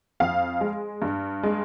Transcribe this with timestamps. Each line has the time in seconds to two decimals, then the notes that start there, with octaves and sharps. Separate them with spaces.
0.20 F2 F5
0.61 G#3
1.02 G2
1.43 G#3